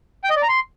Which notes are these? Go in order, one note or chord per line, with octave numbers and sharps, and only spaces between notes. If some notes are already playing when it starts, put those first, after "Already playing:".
G5
D#5
D5
A#5
C6